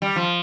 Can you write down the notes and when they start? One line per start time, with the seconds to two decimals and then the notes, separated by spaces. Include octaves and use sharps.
0.02 G3
0.16 F3